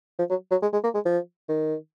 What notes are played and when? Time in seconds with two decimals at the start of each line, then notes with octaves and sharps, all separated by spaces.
0.19 F3
0.30 F#3
0.51 F#3
0.62 G#3
0.73 G#3
0.84 A#3
0.94 G#3
1.05 F3
1.49 D#3